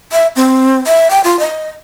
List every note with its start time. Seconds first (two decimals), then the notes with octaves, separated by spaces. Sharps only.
0.12 E5
0.36 C4
0.87 E5
1.10 G5
1.24 F4
1.39 D#5